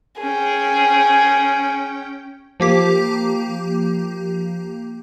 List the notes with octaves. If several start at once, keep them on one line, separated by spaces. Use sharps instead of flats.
C#4 G#4 G5
F3 A#3 G4 D6